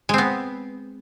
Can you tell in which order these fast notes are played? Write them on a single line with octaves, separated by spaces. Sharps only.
G#3 C4 B3